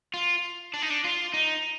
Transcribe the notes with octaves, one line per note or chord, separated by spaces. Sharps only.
F4
D4
D#4
D4
F4
D#4